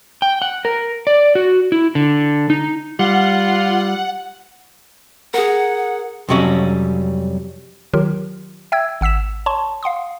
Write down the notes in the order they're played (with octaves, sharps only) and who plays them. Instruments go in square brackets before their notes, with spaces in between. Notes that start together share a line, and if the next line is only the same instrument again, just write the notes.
[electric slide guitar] G5
F#5
A#4
D5
F#4
E4
D3
D#4
[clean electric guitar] G3 [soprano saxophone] F4 [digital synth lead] F#5
[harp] G#4 A#4 [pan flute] F#5
[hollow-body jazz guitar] F2 C3 F#3 G3 C#4
[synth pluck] D#3 F#3 F4 G4 A#4
E5 G5 E6 G#6
G#1 F#5 E6 B6 E7
C#5 A5 C6 C#6
F5 F#5 C6 D#6